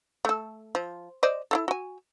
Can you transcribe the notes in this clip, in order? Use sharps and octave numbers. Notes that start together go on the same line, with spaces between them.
A3 A4
F3
C5 D5 D#5
E4 F4 A4
F#4 G#5